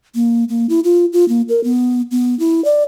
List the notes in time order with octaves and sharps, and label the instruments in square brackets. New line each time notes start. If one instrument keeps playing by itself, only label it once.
[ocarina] A#3
A#3
E4
F4
F4
A#3
A#4
B3
B3
E4
D5